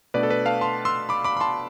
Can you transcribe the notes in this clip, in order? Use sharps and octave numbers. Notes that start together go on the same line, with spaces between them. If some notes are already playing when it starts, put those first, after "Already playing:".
B2 A3 D4 B4 D5
A4
B4
F5 A5
A5 C6
C6 E6
B5 D6
B5 D6
B5
A5 C6